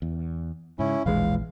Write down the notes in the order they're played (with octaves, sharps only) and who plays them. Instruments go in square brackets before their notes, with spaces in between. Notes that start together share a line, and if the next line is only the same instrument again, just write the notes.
[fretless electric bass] E2
[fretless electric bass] G#2 C#3 [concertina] C#4 E4
[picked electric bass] E1 E3 G#3 [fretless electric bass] A#1 [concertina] F5